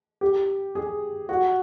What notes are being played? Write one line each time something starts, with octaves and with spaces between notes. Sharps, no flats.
G4
G#4
F#4